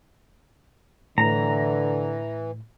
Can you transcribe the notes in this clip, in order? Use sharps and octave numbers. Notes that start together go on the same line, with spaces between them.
A2 D3 E3 A#5